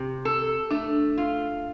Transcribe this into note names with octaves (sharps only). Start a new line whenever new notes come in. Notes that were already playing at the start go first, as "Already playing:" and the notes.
Already playing: C3
A4
A3 D4
F4